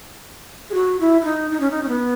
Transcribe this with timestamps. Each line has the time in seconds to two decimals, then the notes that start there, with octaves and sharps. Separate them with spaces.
0.70 G#4
0.74 F#4
1.00 E4
1.21 E4
1.25 D#4
1.51 D#4
1.60 C#4
1.71 D#4
1.83 C#4
1.88 B3